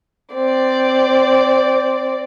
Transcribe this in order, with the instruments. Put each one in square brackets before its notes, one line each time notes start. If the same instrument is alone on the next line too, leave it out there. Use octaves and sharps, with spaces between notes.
[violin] C4 D5